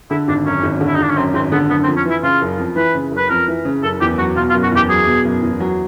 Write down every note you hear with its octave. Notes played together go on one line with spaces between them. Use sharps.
D3 E4
G#1 D4
F#2 C#4
G#1
D3
E4
D#4
G#1 D4
C#4
F#2 C4
G#1 C4
D3 B3
F#1 B3
C4
F2
C#4
E3 E4
C#3 F4
F#1
F2
E3 B4
C#3
F#1
B4
F2 A#4
E3
C#3
F#1 A4
E2 G4
F#3 F#4
B2 F4
F4
F#1
F#4
E2 G4
F#3 G#4
B2
F#1
E2
F#3